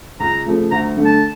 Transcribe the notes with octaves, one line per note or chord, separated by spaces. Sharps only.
C#2 A#5
C#3 F3 A3
D2 A#5
D3 A3 D4
A5